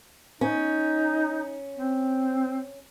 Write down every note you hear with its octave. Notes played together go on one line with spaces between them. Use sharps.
C#4 D#4
C4